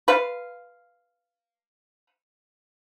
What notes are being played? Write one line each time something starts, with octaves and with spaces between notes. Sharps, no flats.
B4 F5